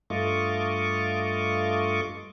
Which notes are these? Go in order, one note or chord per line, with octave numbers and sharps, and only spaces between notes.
G2 A3 F4 D#5 C#6 D6